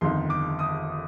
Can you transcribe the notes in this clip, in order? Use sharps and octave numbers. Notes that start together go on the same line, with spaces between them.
G1 F2 D#3 C6
D6
D#6